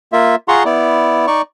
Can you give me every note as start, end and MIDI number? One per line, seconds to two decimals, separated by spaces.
0.12 0.35 58
0.12 0.35 65
0.12 0.35 76
0.48 0.63 65
0.48 0.63 68
0.48 0.63 78
0.48 0.63 82
0.48 0.63 84
0.48 0.63 85
0.65 1.26 59
0.65 1.26 64
0.65 1.26 74
1.27 1.42 63
1.27 1.42 74
1.27 1.42 85